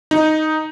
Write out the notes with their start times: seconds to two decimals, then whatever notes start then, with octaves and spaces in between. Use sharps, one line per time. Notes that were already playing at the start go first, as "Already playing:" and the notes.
0.11 D#4